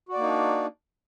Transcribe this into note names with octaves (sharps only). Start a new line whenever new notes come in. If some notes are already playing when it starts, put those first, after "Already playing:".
A#3 D4 D#4 F#4 D5